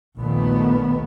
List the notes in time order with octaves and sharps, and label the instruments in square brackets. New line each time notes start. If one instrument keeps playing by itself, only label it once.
[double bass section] A#1 D#2 A#2 D#3 A3 B3